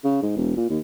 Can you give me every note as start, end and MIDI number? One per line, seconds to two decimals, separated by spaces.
0.04 0.20 49
0.22 0.33 44
0.36 0.54 28
0.57 0.67 46
0.69 0.79 39